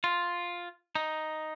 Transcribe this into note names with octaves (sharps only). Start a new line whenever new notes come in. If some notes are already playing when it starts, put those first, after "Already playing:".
F4
D#4